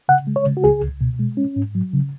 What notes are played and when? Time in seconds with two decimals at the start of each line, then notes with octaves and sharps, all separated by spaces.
0.09 C#3 F#5
0.27 G#3
0.36 C#5
0.46 C#3
0.57 F#4
0.64 C#2 G#4
0.83 C#2
1.01 B2
1.19 G#3
1.37 C#4
1.56 G#2
1.75 F#3
1.93 C#3